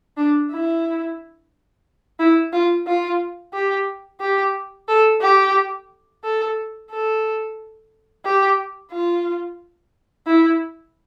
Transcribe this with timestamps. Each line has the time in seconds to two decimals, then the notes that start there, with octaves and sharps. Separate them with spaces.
0.17 D4
0.52 E4
2.19 E4
2.53 F4
2.87 F4
3.54 G4
4.21 G4
4.89 A4
5.22 G4
6.24 A4
6.91 A4
8.25 G4
8.92 F4
10.27 E4